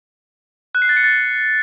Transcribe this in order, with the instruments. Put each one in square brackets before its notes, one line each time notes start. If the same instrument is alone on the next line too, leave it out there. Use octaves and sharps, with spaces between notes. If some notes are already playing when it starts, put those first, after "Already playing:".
[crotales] F#6
C7
A6
C#7
A6